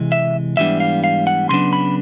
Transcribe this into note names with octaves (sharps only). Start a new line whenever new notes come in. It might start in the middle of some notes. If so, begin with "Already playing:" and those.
Already playing: C3 E3 G#3
E5
G#2 E3 G3 B3 D4 E5
F5
F5
F#5
D2 C#3 F#3 B3 D4 C6
B5